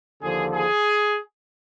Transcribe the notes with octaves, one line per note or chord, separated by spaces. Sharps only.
D#2 D3 F3 G#4
G#4